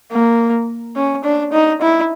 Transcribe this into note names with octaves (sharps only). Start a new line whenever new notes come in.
A#3
C#4
D4
D#4
E4